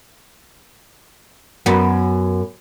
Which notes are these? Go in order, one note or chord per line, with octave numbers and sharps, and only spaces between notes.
F#2 B3